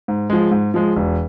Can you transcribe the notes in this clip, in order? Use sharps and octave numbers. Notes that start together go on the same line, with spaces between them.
G#2
F3 G#3
G#2
F3 G#3
E1